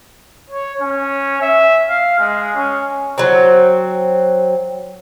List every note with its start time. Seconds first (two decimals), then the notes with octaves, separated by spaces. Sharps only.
0.50 C#5
0.82 C#4
1.42 E5
1.90 F5
2.19 G#3
2.56 C#4
3.18 F#3 C4